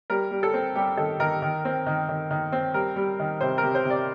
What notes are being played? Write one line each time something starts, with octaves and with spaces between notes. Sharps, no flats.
G3 A#4
G3
A4
C4
G3 G4
D#3 A4
D#3 A#4
D#3
C4
D#3
D#3
D#3
C4
G3 A#4
G3
D#3
C3 C5
A#4
C3
C5
C3
D5